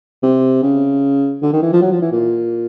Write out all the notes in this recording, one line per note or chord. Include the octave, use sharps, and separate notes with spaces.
C3
C#3
D3
D#3
E3
F3
F#3
F3
E3
A#2